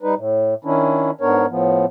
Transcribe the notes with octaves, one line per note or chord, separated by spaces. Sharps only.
G3 D#4 B4
A2
D#3 C#4 D4 E4
G#2 B3 D4 A#4 C#5
A2 F3 B3